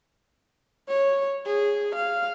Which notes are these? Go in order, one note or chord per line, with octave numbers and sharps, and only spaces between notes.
C#5
G#4
F5